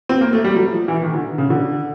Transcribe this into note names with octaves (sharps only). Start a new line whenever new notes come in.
C4
A#3
A3
G3
F#3
F3
E3
D#3
D3
C#3
D3